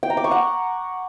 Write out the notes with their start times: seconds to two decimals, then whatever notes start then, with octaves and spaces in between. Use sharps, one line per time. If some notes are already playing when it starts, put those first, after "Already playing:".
0.03 G5
0.10 A#5
0.17 D6
0.24 C#6
0.31 F#5